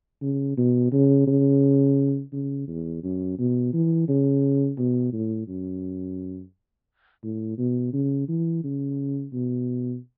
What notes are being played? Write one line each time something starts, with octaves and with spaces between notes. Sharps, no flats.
C#3
B2
C#3
C#3
C#3
E2
F#2
B2
E3
C#3
B2
A2
F#2
A2
B2
C#3
E3
C#3
B2